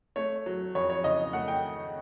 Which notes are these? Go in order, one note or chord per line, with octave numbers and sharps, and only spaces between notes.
A3 C#5
F#3
F2 C#5
C#5
C#3 D#5
A3 F#5
G5